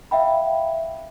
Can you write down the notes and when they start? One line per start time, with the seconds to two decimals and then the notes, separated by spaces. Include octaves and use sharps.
0.11 E5 F5 G5 B5